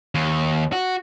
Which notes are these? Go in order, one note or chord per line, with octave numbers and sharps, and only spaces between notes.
D#2
F#4